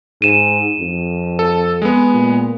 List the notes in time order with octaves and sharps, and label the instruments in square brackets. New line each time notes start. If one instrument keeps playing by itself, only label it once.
[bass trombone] G#2 [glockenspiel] D#7 E7
[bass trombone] F2
[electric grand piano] A4
G#3 B3
[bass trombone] A#2